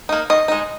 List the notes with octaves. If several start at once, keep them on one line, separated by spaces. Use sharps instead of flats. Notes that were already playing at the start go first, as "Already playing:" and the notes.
A#3 D#4
D#3 D#5
G#3 D#4